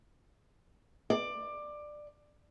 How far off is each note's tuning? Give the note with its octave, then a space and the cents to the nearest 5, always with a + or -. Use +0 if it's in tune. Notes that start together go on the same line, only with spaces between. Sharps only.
D5 +15